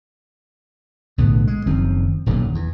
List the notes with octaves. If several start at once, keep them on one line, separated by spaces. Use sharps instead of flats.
B1 A2 D3 B3
G#3
F#1 D#3 F3 C4
D#1 B1 G2 A#2
E2